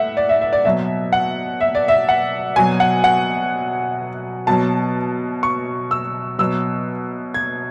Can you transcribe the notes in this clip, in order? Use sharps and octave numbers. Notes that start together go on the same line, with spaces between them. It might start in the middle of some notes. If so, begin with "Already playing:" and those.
Already playing: A2 E5 F#5
D5
E5
E5
D5
B2 F#3 E5
F#5
E5
D5
E5
F#5
B2 F#3 G#5
F#5
F#5
B2 F#3 A5
C#6
E6
B2 F#3 E6
G#6